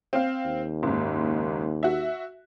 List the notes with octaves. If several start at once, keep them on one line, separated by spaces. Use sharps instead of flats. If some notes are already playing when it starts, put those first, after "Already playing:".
C4 F5
D#2
F#1 G#2
F#4 E5